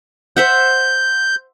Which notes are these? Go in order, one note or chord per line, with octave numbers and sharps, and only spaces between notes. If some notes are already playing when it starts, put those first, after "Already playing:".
C5 E5 F#5 G6